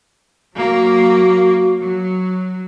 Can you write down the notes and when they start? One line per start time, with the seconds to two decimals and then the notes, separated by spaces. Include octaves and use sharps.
0.57 F#3 A#3 F#4
1.80 F#3